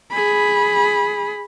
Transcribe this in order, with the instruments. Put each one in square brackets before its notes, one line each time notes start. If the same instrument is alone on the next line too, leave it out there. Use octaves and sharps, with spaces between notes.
[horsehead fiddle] G#4 B5